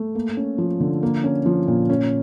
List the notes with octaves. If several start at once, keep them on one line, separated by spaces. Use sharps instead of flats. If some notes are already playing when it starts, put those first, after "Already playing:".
Already playing: A3
A#3
C#4
F3
D3
A#3
C#4
F3
A#2
C#4